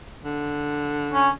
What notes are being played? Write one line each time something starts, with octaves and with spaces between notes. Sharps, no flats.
D3
C#4